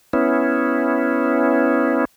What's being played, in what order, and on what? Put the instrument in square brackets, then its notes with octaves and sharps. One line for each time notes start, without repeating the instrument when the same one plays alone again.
[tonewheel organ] B3 C#4 E4